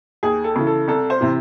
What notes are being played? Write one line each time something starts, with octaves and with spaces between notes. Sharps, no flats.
D#2 G#4
A4
C#3 E3
A4
C2 A4
C5
C3 E3